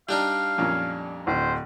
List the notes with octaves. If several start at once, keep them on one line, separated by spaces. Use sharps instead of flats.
G3 D4 D#4 F5 G5
F2 A#2 C#4
D1 C5